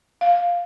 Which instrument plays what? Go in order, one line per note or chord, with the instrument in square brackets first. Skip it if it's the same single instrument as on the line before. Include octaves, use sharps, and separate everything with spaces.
[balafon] F5